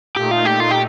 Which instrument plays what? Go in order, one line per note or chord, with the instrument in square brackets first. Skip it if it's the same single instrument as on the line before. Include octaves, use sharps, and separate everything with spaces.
[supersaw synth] A#2 A3 D#4 [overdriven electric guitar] G4
[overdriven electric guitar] F4
G4
F4
G4